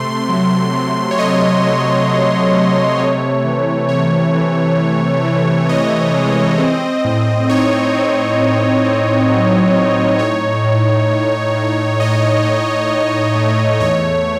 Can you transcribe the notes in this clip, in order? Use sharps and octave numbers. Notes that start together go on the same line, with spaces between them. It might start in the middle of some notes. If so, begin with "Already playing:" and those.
Already playing: C3 A3 C6
F#3
C3
C#5
A3 D#5
F#3
F#3
A3
C3 C#5
E3
C3 C#5
E3
E3
E3
E3 D#5
G#3
C4
A2
D#4 C#5
C4
A2
C4
F#3
D#4
A2 C#5
A2
A2
A2
A2 D#5
A2
A2
A3
E2 C#5